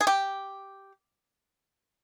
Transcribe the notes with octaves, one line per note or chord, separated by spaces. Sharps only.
G#4
G4